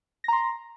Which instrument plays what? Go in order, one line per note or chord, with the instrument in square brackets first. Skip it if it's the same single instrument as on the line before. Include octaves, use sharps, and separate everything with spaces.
[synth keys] A#6
A#5
C6